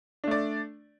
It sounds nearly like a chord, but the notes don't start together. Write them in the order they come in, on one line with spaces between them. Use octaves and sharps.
D4 A3 D5